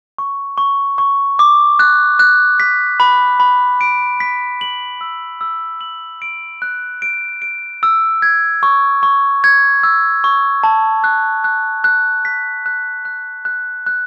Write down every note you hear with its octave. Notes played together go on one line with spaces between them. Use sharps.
C#6
C#6
C#6
D6
F#6
F#6
B6
B5
B5
D7
B6
F#7
E6
E6
F#7
D7
F#6
D7
D7
E6
G#6
C#6
C#6
G#6
E6
C#6
A5
F#6
F#6
F#6
B6
F#6
F#6
F#6
F#6